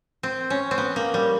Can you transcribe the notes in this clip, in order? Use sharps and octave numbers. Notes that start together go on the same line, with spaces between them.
C4
C#4
C4
B3
A#3
G3